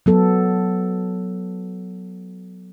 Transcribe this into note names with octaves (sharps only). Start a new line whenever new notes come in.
F#3 B3 A4